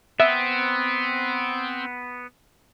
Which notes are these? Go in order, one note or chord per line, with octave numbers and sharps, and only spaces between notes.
B3 C4 E5